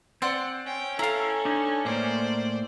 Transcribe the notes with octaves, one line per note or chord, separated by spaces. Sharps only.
C4 D5 F#5 C6
C#4 G5
E4 A4 F5 A5 A#5
D4 D#4
A2 A#3 C5 D5